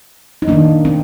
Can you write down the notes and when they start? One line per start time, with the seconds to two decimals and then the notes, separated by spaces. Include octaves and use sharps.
0.42 D#4
0.48 D#3 A#3 D4
0.85 C4